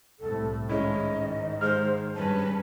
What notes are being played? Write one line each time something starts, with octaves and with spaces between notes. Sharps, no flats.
C2 A2 A4
G#2 D#3 G#3 C#4 E4 D#5
G#3 C5 F6
G2 C#4 B4 A5